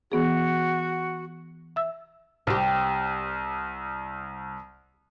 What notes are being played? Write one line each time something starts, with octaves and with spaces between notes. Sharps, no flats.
E3 B3 F#4 G#4
E5 E6
C2 C4 G4